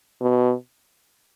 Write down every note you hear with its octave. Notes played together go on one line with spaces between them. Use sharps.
B2